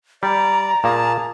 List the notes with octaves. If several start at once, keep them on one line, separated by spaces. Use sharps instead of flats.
G3 D5 A#5
A#2 A#3 G#4 A5